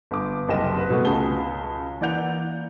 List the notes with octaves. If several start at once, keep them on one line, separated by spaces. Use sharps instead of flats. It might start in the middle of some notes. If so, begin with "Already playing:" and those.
G1 D6
F#1 C2 G4 D#5 E7
B4
B2 G3 A3 B3
C#2 C#3 G#4 A5 G7
E3 A#3 D5 F#5 G6 F7